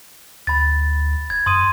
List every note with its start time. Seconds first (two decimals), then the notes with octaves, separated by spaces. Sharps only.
0.47 D2 B5 A6
1.30 E1 G#6
1.46 F#2 C6 D#6 D#7